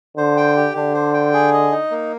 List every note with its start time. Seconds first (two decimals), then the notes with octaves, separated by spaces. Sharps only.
0.17 D3 C5
0.37 G5
0.57 G4
0.75 D3 D4
0.94 C5
1.14 G5
1.33 G#4
1.53 D#5
1.72 D#4
1.91 A#3